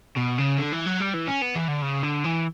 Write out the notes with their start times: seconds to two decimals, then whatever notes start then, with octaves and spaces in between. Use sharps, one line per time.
0.16 B2
0.38 C#3
0.58 D3
0.72 E3
0.86 F#3
1.00 G3
1.13 E3
1.27 C#4
1.42 B3
1.55 E3
1.68 D3
1.82 C#3
2.03 D3
2.24 E3